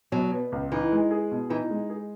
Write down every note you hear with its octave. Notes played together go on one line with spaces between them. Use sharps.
B2 F#3
B3
C#2
E3 D#4
G#3
G#4
B2
E3 D#4
G#3
G#4